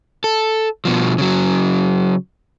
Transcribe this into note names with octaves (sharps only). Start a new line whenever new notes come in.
A4
B2 F3
C#3 F#3